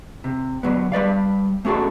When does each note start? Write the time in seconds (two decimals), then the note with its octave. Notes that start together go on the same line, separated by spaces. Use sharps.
0.24 C3
0.63 D3 F#3 B3
0.92 G3 B4 D5 F5
1.65 A3 C#4 F#4 G#4 A4